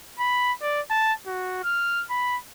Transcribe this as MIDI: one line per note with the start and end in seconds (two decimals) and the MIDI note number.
0.19 0.52 83
0.62 0.81 74
0.90 1.13 81
1.27 1.63 66
1.64 2.04 89
2.10 2.37 83